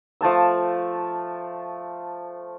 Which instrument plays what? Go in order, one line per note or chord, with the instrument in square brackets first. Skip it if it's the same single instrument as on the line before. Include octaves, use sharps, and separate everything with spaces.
[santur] F3 A3 A5 E6